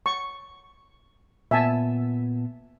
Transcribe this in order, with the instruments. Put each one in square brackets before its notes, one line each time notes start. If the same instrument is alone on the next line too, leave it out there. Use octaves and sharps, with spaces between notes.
[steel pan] C#6
[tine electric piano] A#2 B3 [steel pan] E5 G#5 A5